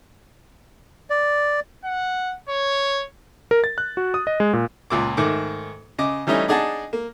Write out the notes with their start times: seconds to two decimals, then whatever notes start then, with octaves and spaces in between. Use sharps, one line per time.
1.10 D5
1.84 F#5
2.49 C#5
3.51 A#4
3.64 A6
3.78 F#6
3.97 F#4
4.14 D#6
4.27 D#5
4.40 G#3
4.53 A#2
4.90 C#2 A#2 D6
5.17 G#2 D#3 A3 D6
5.99 C#3 D#5 D6
6.27 E3 G3 A3 C#4 D#4
6.48 D4 D#4 G#4 F#5 A5
6.93 A#3